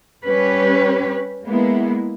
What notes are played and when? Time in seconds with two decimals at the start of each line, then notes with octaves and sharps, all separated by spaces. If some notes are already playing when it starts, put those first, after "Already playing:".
0.25 G3 C#4 G4 B4
1.45 G#3 A#3 B3 E4